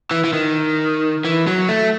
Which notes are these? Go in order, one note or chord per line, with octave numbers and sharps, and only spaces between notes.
E3
E3
D#3
E3
F#3
A3